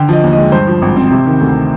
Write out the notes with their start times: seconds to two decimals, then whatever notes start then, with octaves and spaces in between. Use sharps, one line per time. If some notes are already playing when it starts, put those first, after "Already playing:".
Already playing: D3 G5
0.09 F3 D#5
0.23 D#2
0.33 G#3 D#5
0.52 G2 C5
0.67 F3
0.82 G#1
0.97 C4
1.11 C3
1.26 D#3
1.41 D2